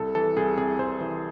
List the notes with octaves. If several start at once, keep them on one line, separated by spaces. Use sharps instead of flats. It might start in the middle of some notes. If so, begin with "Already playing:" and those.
Already playing: C2 A4
E3 A4
C2 G#4
C3 G#4
C2 C5
E3